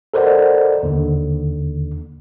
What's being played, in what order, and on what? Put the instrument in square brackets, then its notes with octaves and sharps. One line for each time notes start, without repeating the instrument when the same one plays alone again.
[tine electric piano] A4 A#4 C5 D5 D#5 F#5
D#2 D3